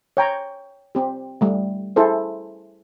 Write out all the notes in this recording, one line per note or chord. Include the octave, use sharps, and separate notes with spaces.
C#5 G5 A#5
C4 G4
G3 A3
E4 G#4 A4 C5